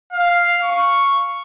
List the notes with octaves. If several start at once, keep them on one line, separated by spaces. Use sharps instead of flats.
F5
C#6